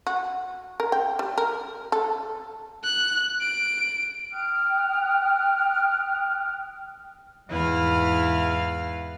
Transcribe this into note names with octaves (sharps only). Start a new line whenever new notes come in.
F#4
A#4
G5
G3
A#4
A4
F#6
D7
G5 D#6 F6 F#6
E2 G#2 E4 B4 F5 F6